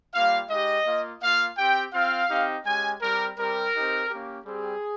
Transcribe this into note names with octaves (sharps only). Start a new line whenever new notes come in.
G3 A#3 F4 F5
G#3 D#4 G4 D#5
A#3 F4
A#3 F4 F5
C4 G4 G5
C4 F4 F5
C4 D#4 G4
G#3 C#4 G4 G#5
G3 C4 G4 A#4
G3 C4 G4 A#4
C4 D#4 G4
A#3 C#4 G4
G3 C4 G4 G#4